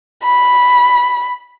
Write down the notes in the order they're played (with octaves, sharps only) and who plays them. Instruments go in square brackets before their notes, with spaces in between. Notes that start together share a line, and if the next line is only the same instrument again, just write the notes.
[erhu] B5